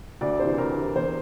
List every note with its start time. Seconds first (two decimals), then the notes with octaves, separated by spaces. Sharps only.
0.21 D2 D5
0.39 C3 E3 C5
0.58 D2 A#4
0.77 C3 E3
0.96 E2 C5